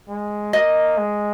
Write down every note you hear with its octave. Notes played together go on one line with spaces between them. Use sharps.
G#3
A#3 D#5
G#3